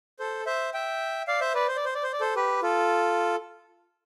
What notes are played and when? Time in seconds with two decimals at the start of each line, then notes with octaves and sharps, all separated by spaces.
0.19 A4 C5
0.46 C5 E5
0.74 E5 G5
1.27 D5 F5
1.40 C5 E5
1.54 B4 D5
1.68 C5
1.76 D5
1.85 C5
1.95 D5
2.03 C5
2.13 D5
2.20 A4 C5
2.36 G4 B4
2.62 F4 A4